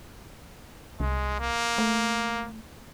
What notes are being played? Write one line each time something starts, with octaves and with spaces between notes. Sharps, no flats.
C2 G#3
A#3
A3